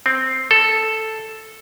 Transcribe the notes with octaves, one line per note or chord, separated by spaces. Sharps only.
C4
A4